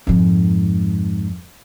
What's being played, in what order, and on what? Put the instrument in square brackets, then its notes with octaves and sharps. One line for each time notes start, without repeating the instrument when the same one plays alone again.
[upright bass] F2 G#2